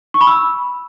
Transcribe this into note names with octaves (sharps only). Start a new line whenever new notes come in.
C#6
B5
E6